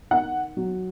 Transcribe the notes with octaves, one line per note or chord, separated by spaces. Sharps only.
D#3 F#5
F#3